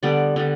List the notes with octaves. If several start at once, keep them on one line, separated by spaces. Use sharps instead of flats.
D3 G3 B3 D5
D3 G3 B3